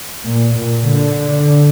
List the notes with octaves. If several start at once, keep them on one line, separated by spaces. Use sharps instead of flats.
A#2
A#2
D3